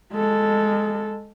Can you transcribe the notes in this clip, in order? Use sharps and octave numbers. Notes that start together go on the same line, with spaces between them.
G#3 A4